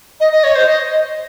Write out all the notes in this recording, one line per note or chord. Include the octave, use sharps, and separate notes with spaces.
D#5
D#5
C#5
C5
D#5